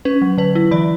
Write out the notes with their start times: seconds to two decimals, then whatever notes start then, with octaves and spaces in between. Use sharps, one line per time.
0.05 C#4 B4
0.22 F#3
0.38 D3 B4
0.55 E4
0.71 E3 D5